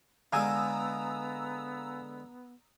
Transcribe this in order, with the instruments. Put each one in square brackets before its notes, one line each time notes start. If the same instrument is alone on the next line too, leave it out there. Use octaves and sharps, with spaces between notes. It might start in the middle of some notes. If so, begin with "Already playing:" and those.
[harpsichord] D3 G#3 [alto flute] B3 [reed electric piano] F5 G#5 [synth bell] A#5 D#6 E6